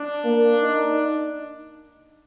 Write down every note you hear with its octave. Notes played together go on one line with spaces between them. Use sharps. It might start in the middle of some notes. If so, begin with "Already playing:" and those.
Already playing: D4
A#3
D#4